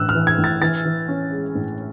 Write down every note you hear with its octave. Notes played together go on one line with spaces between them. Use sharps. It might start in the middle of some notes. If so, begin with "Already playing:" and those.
Already playing: A1 A2 E3 E6 F#6
F6
E3
G#6
A2
A6
E3 A6
E3
C#4
G#3
A2